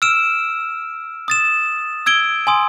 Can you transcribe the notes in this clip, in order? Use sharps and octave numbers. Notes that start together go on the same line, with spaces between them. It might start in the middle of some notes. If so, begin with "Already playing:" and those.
E6 F6 D7 E7
D#6 A6 E7
E6 G#6 D7 G7
G#5 C6 D#6